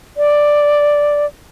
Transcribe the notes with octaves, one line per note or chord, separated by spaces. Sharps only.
D5